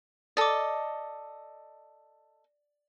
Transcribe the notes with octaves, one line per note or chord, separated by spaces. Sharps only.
A4 D5 D#5 D6